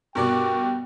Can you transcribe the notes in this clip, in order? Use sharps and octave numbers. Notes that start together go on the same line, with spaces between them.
G2 B2 F#4 A#4 D5 G5 C#6